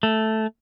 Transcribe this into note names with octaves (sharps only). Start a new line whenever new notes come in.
A3